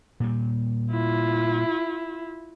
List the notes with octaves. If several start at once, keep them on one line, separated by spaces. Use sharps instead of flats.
A#2 G3
E4 F4